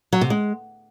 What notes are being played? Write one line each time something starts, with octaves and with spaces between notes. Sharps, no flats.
F#3
C3
G#3